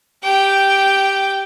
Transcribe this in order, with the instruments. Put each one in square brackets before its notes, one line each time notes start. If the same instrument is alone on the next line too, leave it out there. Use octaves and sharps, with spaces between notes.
[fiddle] G4 G5